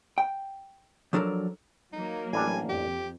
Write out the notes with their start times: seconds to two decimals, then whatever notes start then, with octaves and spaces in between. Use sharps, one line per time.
0.18 G5
1.13 F3 F#3 D4 A4 A#4
1.93 F#3 A#3 D#4
2.33 A1 G3 D4 G#5
2.69 F2 G4